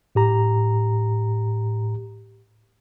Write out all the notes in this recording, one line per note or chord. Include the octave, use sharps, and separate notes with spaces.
A2 G4 A#5